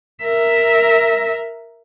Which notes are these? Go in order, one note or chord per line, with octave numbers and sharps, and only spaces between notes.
A#4 E5